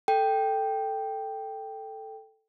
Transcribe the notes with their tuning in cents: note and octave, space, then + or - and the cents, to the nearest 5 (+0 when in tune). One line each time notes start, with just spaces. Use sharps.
A4 +0 G5 +0